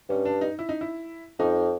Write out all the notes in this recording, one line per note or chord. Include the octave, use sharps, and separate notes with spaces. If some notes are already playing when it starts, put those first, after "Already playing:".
G2 C#4
D4
D#4
E4
D#4
E4
F2 D#4